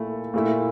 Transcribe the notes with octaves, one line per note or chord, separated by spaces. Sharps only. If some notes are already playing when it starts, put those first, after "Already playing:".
Already playing: A#2 A3 E4
A#2 A3 E4